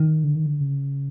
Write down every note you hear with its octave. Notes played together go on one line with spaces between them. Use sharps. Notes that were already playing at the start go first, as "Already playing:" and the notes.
Already playing: D#3
D3
D#3
D3
C#3